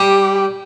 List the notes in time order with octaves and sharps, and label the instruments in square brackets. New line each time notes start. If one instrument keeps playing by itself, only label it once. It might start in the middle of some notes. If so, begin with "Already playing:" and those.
Already playing: [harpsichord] G3 [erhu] G4